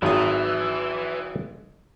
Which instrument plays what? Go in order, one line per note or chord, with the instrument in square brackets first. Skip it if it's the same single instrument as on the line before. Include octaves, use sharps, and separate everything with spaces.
[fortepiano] G#1 D#6 [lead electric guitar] E3 [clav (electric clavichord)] F#3